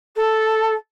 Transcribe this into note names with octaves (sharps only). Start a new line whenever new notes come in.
A4